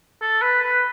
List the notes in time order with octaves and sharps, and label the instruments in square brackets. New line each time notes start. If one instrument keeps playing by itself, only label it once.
[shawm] A4
B4
B4